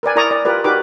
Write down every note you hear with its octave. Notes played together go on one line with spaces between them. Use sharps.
A#4 B4 D5 G#5
E4 A#4 D5 A#5 C#6 D#6
D5
F4 G4 A#4 B4 D5
D#4 F#4 G4 A#4 B4 D6